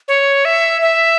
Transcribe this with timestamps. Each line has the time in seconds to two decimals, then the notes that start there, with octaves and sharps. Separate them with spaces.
0.08 C#5
0.45 E5
0.81 E5